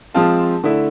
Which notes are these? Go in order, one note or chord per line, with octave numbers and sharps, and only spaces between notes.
F3 G#3 C4 F4 A5
D3 A3 E4